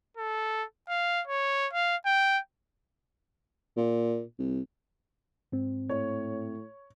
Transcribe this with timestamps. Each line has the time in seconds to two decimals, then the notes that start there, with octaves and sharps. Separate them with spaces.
0.17 A4
0.89 F5
1.27 C#5
1.73 F5
2.06 G5
3.77 A#2
4.39 C2
5.52 G#2 C4
5.89 A2 C#5